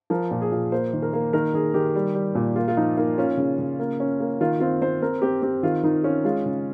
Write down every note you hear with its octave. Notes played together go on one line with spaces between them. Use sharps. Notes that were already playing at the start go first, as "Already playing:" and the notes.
F3 A#4
A#2
G#4
A#2
A#3 C5
D#3
A#4
A#3
D#3 A#4
D#3 G#4
D#3 G4
G3
G3
A#2
A#3 F4
F4
F3 D#4
A#3 D#4
C#4 F4
C#3
C#3
A#3
C#4
A#3
D#3 F4
C4 F4
C4 C5
C4 A#4
C4 G4
C4 G4
D#3 F4
D#3 D#4
C#4 F4
G#3 F4
C#3